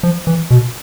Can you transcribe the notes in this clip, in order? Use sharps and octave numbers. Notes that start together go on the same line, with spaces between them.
F3
E3
B2